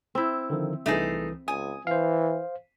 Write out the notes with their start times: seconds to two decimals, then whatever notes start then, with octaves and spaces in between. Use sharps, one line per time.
0.15 C4 E4
0.50 D3 D#3 F3
0.86 C2 E3 A3 D#4 G#4
1.48 C#2 G#5 D#6
1.87 E3 C5 F5